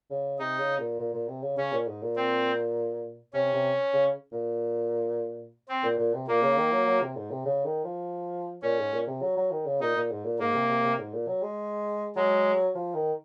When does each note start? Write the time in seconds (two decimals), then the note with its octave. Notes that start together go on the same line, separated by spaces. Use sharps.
0.10 C#3
0.39 C3 D#4
0.59 C#3
0.79 A#2
0.99 A#2
1.13 A#2
1.28 C3
1.42 C#3
1.57 C#3 C#4
1.72 A#2
1.87 G#2
2.02 A#2
2.16 C4
3.33 C3 C#4
3.53 C3
3.93 C#3
4.32 A#2
5.68 C4
5.83 A#2
5.98 A#2
6.14 C3
6.27 A#2 A#3
6.42 C#3
6.57 D#3
6.72 F#3
6.86 F#3
7.02 C3
7.16 G#2
7.30 C3
7.45 C#3
7.65 D#3
7.84 F3
8.62 A#2 C#4
8.78 G#2
8.92 A#2
9.07 C3
9.22 F#3
9.37 F#3
9.51 D#3
9.66 C#3
9.80 A#2 D#4
9.95 A#2
10.10 G#2
10.24 A#2
10.39 G#2 A#3
10.54 C3
10.69 C3
10.83 C3
10.98 G#2
11.13 A#2
11.27 F#3
11.42 G#3
12.16 F#3 G#3
12.75 F3
12.94 D#3